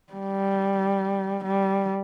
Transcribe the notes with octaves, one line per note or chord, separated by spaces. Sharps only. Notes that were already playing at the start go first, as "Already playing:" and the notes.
G3
G3